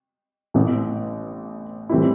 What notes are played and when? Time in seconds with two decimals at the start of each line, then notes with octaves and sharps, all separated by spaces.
0.54 A1 A2 E3 B3
1.89 A2 E3 G3 C4 E4